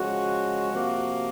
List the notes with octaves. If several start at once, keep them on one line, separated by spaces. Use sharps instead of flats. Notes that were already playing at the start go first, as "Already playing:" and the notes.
Already playing: C#3 F3 G#3 F#4
C3 F3 A#3